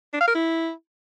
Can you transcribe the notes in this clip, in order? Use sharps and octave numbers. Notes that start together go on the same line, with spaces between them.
D4
F5
A#4
E4